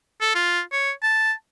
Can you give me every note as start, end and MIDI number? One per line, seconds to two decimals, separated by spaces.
0.21 0.32 69
0.35 0.61 65
0.72 0.91 73
1.02 1.32 81